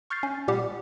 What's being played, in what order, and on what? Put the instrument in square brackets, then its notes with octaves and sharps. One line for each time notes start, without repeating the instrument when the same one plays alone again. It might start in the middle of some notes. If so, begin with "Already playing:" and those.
[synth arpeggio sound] C#6 F6 G6 A6 C7
C#4
A#2 G3 G4 F#5